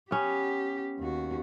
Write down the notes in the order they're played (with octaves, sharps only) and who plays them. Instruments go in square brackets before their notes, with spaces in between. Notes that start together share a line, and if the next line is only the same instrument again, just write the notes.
[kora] B3 C#4 [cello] G4
[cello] D#2 F#4